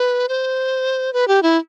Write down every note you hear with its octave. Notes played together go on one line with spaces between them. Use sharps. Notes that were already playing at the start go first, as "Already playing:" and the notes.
Already playing: B4
C5
B4
G4
E4